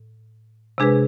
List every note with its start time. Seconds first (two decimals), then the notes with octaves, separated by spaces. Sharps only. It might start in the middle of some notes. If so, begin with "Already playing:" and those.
Already playing: A2
0.78 C3 G#3 D4 G#4 B4